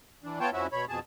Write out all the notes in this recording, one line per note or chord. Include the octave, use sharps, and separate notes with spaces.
E3 D4
B3 F4 C#5 G5 A5
F2 F3 C#4 E4 F#4 E5
B2 C#5 B5
F2 B2 G#4 A5